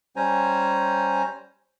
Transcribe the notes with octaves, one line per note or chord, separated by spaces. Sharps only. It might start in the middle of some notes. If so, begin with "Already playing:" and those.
G3 C#4 C5 G#5 A#5